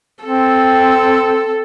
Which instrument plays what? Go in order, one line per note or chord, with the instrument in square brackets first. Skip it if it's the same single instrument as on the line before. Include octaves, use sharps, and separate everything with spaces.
[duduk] C4 [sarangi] A4